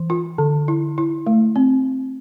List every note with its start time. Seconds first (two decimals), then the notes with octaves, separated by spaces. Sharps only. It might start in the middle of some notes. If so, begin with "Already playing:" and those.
Already playing: E3
0.10 F4
0.38 D3
0.68 E4
0.98 E4
1.27 A3
1.56 C4